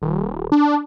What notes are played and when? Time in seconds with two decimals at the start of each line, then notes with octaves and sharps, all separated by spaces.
0.02 D#1
0.52 D4